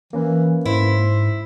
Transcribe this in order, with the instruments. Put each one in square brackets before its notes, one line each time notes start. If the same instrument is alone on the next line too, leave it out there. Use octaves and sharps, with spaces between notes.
[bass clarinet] E3 [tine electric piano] A#3 C#4 B4
[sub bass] G#2 [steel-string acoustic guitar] E4 [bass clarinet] C5